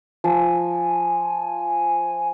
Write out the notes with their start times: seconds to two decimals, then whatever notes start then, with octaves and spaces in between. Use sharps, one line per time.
0.24 F3 G#5